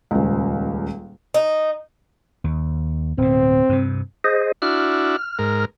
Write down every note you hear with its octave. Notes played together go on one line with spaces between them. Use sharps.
D#1 C#2
D#4
D#2
D1 B2 C4
G2 C3
G#4 C5 D#5
D4 E4 F#4 F6
G#2 A#4